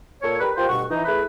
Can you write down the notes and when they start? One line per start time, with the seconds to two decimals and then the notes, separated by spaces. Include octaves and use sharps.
0.21 A#2 A4 C#5
0.39 G3 A#4 B4
0.56 F4 G4 A#4 C5
0.68 D2 G2 B2 F#5 C#6
0.90 E3 D#4
1.05 A3 E4 G#4 B4